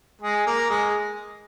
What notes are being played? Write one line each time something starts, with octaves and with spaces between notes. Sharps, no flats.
G#3 G#4
A#3 A#4
G#3 G#4